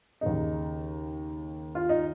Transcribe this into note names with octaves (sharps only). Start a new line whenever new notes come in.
D#2 C#3 D#4
F4
D#4